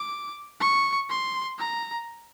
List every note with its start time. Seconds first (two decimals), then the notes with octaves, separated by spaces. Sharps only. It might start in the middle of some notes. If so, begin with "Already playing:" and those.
Already playing: D6
0.60 C#6
1.09 C6
1.59 A#5